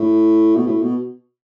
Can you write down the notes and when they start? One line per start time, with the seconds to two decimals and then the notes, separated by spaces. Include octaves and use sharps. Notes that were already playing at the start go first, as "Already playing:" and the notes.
Already playing: A2
0.56 B2
0.67 A2
0.82 B2